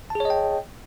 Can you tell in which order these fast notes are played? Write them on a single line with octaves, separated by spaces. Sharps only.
A5 G#4 C#5 D#5 G5